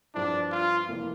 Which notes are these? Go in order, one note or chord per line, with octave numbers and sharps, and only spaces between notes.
G2 F3 C4 D4 E4
F4
F1 F2 E3 A#3 E4